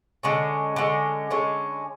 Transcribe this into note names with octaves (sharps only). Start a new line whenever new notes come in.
D3 G#3 C#4
D3 G#3 C#4
D3 G#3 C#4